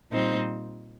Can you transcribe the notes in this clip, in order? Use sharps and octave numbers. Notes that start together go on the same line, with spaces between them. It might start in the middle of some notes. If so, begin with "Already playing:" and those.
A#2 G3 C4 D#4 C5